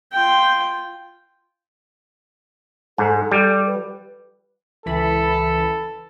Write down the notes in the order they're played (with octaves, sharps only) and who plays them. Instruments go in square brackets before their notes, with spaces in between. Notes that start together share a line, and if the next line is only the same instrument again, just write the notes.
[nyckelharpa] F4 G5
[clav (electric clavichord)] G#2 [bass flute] A4
[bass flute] A4
[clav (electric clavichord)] G3
[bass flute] B4
[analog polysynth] C#2 E3 B5 [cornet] A4